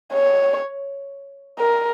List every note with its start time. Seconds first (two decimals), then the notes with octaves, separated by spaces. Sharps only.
0.13 C#5
1.59 A#4